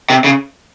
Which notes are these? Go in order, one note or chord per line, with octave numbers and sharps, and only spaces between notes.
C3
C#3